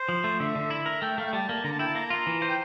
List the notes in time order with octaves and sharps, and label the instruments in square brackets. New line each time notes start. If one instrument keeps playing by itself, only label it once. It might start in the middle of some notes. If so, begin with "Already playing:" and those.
Already playing: [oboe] C5
[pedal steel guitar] F3
A3
[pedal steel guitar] D3 [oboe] E5
[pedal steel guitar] D3
E4
A#4
[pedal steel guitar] A3 [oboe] G5
[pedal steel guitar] A3 [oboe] F5
[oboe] G5
[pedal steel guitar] G3 [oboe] A5
[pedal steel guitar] A#3
[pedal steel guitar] D3 [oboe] A#5
[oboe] A5
[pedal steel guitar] E4 [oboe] G5
[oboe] A5
[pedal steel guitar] A#3 [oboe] A#5
[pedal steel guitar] F4
E3
C5
[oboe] G5